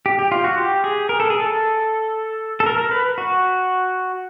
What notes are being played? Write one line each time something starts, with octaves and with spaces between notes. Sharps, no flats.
G4
G4
F4
F#4
G4
G#4
A#4
A4
G#4
A4
A4
A#4
A#4
B4
F#4